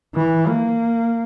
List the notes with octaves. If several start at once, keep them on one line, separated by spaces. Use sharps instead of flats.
E3
A#3